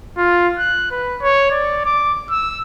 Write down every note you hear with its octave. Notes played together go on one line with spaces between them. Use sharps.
F4
F#6
B4
C#5
D5
D6
E6